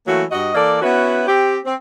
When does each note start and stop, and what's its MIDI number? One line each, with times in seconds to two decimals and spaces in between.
0.06 0.23 52
0.06 0.23 54
0.06 0.23 57
0.06 0.23 58
0.06 0.23 66
0.31 0.52 43
0.31 0.52 66
0.31 0.52 75
0.54 0.78 52
0.54 0.78 58
0.54 0.78 69
0.54 0.78 74
0.81 1.22 59
0.81 1.22 61
0.81 1.22 64
0.81 1.22 66
0.81 1.22 71
1.27 1.57 60
1.27 1.57 67
1.65 1.74 60